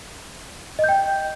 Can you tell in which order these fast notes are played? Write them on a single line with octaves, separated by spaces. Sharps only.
D#5 G6 G5